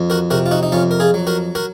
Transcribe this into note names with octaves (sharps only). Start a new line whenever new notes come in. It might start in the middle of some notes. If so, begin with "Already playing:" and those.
Already playing: F2
F#4 A#4
C3 F#4 A#4
F4
D#4 F#4
D#4
F2 C#4 F4
A#4
F4 G#4
F#3
F#4 A#4
F#4 A#4